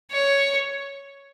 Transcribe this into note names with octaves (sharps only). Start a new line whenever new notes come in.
C#5